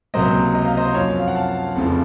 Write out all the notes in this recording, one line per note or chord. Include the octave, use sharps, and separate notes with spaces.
C#2 C3 F#3 A#3 C5 D#5
D#5
F5
C5 D#5
F#2 F3 C4 C#5 F5
F5
F#5
F5 A5
F1 F2 C#3 F3